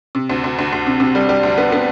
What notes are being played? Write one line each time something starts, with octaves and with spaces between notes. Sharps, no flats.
C3
D2
D2
D2
D2
C3
C3
G3
G3
D2
B3
B3